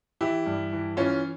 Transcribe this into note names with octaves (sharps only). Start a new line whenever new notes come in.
E3 E4 G4
G2
E3
E3 C#4 F4